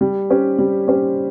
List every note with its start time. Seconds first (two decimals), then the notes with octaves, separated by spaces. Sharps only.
0.01 G3
0.30 C#4 G4 C5
0.59 G3
0.88 C#4 G4 C5